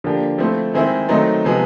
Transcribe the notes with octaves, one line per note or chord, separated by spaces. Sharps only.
D3 F3 A#3 D4 G4
F3 A3 C4 E4
D#3 G#3 C4 E4
D#3 F#3 A3 C4 D#4
C3 F3 G#3 B3